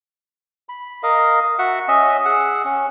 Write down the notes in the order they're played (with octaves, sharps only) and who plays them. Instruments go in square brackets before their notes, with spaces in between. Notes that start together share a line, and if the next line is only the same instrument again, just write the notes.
[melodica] B5
A#4 D#5 F5
F#4 E5 F#5
C#4 D#5 E5
G#4 F#5 E6
C#4